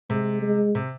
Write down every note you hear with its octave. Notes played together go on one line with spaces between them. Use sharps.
C3 G#3
G#3
C3